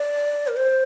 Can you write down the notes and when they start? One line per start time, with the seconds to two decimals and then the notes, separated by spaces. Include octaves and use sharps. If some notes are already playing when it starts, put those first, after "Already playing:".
Already playing: D5
0.47 A#4
0.56 C5